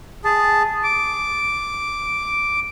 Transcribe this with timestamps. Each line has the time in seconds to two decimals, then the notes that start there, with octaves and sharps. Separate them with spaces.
0.25 G#4 A5
0.84 D6